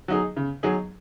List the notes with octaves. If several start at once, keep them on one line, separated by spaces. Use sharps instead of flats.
F#3 D#4 G#4
C#3
F#3 D#4 G#4